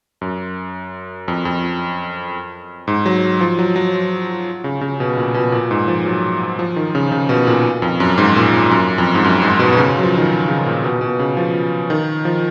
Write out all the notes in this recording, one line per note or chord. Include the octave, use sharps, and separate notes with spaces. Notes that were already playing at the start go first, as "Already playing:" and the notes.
F#2
F2
F2
G#2
F#3
F3
F#3
F#3
C#3
C#3
B2
A#2
B2
A#2
G#2
F3
F#3
F3
D#3
C#3
C#3
B2
A#2
F2
F#2
G#2
A#2
F#2
F2
G#2
F#2
G#2
B2
B2
C#3
F#3
F3
D#3
C#3
A#2
B2
B2
C#3
F3
D#3
F3